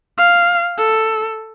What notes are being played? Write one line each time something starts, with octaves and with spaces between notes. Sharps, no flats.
F5
A4